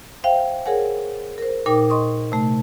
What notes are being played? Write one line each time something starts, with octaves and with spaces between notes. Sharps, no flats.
C5 E5 F5 G5
G#4 A#4 C#5 F#5 G#5
A#4 C5
A#2 D#4 A#4 G5 D6
D#5 C6 C#6 D#6
C3 A3